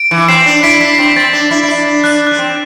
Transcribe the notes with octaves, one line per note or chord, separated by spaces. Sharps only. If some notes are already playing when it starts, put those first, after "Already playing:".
Already playing: D7
E3
C4 C7 E7
D4
E4 B6 D7
D4 B6
C7
C4 B6
C4 A6
D4
E4
E4
D4
D4
D4 F#6
D4 F#6
C4